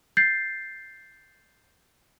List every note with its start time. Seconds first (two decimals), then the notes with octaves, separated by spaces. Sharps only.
0.17 G6 A6 C7